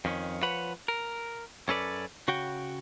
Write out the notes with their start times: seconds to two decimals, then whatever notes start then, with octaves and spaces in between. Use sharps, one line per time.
0.05 F2 D#3 C#4
0.42 F3 B4 C#5 F#5 B5
0.88 A#4
1.68 F#2 C#4 A4 B4 D5
2.28 C#3 F#4 F#5 G5